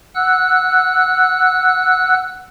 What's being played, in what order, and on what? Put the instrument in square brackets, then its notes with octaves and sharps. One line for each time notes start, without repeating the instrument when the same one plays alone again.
[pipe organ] F#5 E6 F#6